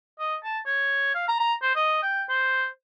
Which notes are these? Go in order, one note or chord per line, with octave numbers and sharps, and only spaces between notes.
D#5
A5
C#5
F5
A#5
A#5
C5
D#5
G5
C5